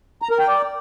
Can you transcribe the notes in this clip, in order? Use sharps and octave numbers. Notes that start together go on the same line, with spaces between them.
A#5
A#4
G5
D5